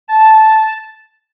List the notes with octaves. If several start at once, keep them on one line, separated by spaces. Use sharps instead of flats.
A5